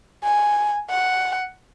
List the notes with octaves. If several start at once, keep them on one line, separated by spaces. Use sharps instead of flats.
G#5
F#5